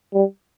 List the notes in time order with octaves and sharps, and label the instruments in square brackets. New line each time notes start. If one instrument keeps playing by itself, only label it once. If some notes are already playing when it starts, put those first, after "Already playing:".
[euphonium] G3